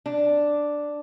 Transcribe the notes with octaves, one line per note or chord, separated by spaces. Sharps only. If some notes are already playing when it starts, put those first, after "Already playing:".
D4